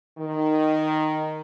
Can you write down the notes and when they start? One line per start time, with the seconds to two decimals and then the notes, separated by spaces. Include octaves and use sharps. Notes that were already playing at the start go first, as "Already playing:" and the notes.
0.19 D#3